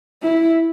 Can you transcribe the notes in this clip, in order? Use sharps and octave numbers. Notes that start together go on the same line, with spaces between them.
E4